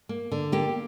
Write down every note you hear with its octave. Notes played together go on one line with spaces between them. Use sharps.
A#3
D3
A#3 G4